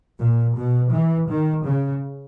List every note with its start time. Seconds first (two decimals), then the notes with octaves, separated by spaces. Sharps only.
0.21 A#2
0.58 B2
0.94 E3
1.30 D#3
1.66 C#3